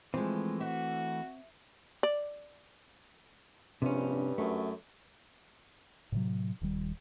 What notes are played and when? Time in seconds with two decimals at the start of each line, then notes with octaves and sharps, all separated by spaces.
0.14 E3 F3 G#3 A3 C4
0.61 F#4 E5
2.03 D5
3.82 A#1 G2 C3 C#4
4.38 F#2 A3
6.12 A2 C3 F#3
6.61 D#1 D#3 G3